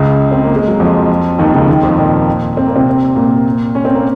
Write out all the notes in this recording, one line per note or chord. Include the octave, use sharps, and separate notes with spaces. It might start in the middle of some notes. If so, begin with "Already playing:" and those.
Already playing: C#2 C#3
C4
A#3
G#3
F#3
F2 F3
D#2 D#3
C#2 C#3
D#2 D#3
F2 F3
A#2 A#3
C4
A#3
C3 C4
A#2 A#3
C#4
C4
A#3